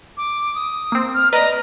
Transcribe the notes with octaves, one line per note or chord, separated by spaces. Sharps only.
D6
D#6
A#3 C4
F6
B4 D5 D#5 A#5